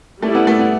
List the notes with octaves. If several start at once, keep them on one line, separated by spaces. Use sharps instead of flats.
G3 A3 E4 A4 D5
B3
A3
B3